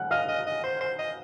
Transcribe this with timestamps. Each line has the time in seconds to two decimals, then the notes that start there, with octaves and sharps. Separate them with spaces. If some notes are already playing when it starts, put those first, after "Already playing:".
Already playing: F#5 F#6
0.11 D#5 F5 F6
0.29 D#5
0.47 D#5
0.64 C5
0.81 C5
0.99 D#5